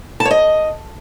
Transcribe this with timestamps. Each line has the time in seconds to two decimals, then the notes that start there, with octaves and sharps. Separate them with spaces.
0.20 A5
0.25 C#5
0.31 D#5